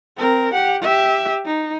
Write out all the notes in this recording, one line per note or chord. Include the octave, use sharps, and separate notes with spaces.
C4 A#4
G4 F#5
G4 E5
D#4